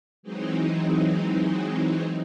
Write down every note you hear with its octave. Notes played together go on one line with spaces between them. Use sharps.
E3 F#3 G#3 C4 D#4